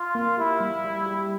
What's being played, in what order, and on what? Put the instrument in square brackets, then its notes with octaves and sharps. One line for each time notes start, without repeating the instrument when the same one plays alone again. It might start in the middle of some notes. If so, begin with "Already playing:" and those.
Already playing: [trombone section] F4
[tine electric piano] A#3
[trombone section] E4 [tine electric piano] G4
[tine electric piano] G3
G3
G4